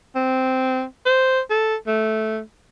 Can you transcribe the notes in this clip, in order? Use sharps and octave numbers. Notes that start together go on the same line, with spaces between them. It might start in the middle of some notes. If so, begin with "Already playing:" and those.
C4
C5
A4
A3